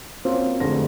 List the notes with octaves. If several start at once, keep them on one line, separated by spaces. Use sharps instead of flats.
A#3 C4 C#4 F4 F#4 C5
F1 D3 G#3 A3 C5 A#6